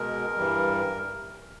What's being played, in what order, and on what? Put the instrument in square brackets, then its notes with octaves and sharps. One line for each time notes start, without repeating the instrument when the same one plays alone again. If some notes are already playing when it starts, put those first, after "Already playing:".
Already playing: [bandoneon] B2 G#3 A#4
G2 E3 G3